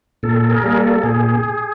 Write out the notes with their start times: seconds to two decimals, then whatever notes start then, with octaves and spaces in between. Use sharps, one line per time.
0.23 A#2 A4
0.50 G#4 A#4
0.64 G3 A#3 G#4
0.76 A4
1.03 A#2 G#4